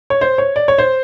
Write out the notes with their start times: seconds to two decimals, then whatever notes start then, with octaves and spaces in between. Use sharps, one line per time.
0.10 C#5
0.21 C5
0.38 C#5
0.56 D5
0.68 C#5
0.78 C5